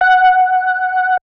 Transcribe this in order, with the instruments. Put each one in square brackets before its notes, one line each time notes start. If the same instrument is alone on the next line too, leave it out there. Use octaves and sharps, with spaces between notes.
[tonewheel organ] F#5